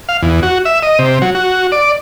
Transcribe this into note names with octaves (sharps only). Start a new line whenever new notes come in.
F5
E2
F#4
E5
D#5
C3
F#3
F#4
D5